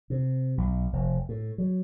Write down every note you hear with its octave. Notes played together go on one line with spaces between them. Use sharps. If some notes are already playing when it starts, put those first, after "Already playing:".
C3
B1
F1
A2
F#3